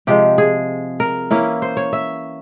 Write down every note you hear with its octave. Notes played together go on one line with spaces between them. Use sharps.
C3 F3 G#3 G4
G#4
A#4
E3 A#3 C#4 E4
C5
C#5
E5